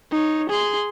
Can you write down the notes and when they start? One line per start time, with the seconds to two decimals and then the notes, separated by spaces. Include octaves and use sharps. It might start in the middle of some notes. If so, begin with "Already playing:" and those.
0.11 D#4 C#5
0.49 G#4 C6